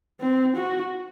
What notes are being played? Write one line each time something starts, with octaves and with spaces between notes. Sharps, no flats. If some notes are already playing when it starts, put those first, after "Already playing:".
C4
F#4